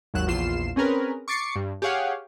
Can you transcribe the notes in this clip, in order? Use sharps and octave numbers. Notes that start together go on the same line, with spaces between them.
G#1 D#2 F#3 F#6 E7
A#1 E2 F4 C7 E7
C4 C#4 G#4 A#4 B4
C#6 D6 A6 C7 C#7
G2
G4 G#4 C#5 F5 F#5